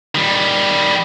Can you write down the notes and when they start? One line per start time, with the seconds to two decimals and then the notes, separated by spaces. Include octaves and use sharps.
0.15 D#3 G3